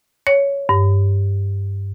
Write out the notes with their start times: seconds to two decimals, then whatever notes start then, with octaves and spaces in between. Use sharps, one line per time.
0.27 C#5
0.69 G2